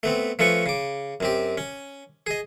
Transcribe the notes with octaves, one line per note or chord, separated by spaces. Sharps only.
A3 B3 C4
F3 A3 C#4 A4 B4 C#6
C#3 D6
F#2 C4 G4
C#4
G#4 D#5